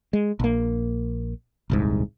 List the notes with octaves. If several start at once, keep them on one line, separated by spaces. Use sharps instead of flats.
G#3
A#1 A#3
D#1 C2 G#2